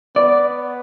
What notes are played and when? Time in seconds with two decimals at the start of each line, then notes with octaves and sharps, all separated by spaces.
0.16 B3 D5